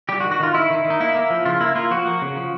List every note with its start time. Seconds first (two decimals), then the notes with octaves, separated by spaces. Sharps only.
0.09 G3 G4
0.20 F#4
0.25 D#3
0.31 F#4
0.40 D#3 F4
0.54 D#3 E4
0.70 D#3
0.85 D#3
0.90 D#4
1.00 A#3 E4
1.15 A#3
1.30 F3
1.45 C#3 F4
1.61 A#3 E4
1.76 A#3 F4
1.91 F3 F#4
2.06 A#3
2.22 C#3
2.36 F3